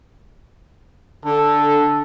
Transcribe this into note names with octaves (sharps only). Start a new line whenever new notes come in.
D3 A4